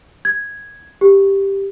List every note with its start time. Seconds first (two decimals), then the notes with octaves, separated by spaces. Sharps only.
0.25 G#6
1.01 G4